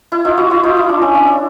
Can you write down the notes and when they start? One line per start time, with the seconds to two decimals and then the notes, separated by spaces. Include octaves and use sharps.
0.12 E4
0.25 D#4 F4
0.37 E4 F#4
0.50 E4 F#4
0.63 D#4 F4
0.77 E4
0.89 D4
1.02 C#4
1.14 D4
1.27 E4